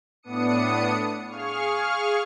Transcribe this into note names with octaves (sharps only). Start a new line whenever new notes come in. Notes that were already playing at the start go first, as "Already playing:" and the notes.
A2 B3 D4 D#6 C#7
G#4 F5 C#6 F6